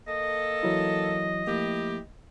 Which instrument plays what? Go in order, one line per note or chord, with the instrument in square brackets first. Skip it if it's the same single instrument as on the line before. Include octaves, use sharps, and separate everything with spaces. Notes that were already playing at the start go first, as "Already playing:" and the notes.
[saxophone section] A#3 A4 [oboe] D#5
[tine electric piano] E3 F#3 E4
[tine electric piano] F3 A3 A#3 [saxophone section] E4 G4